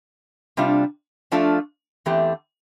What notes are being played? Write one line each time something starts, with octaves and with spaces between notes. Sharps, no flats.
C3 G3 D4 F4
F3 A3 D4 F4 A4
E2 E3 A3 C4 G4